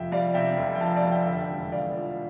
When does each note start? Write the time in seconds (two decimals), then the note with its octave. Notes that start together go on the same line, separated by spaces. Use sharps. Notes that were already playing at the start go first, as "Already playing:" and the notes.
Already playing: F1 F2 C3 E5 F5 G5
0.12 G3 D5 F5
0.34 C3 E5 G5
0.57 F1
0.75 G5
0.80 F2 F5 A5
0.95 D5 F5
1.04 G3
1.11 E5 G5
1.27 D3 E5 G5
1.50 E1
1.72 E2 D5 F5
1.95 F3